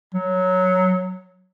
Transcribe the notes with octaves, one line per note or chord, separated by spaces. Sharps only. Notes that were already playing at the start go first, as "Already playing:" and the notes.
F#3